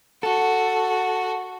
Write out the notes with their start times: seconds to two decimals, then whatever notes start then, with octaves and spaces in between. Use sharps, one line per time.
0.23 F#4 A4